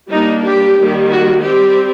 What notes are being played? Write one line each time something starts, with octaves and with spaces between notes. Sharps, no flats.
G3 A#3 D4 D#4
G4
D#3 G3 A#3
F#4
G3 C4 G4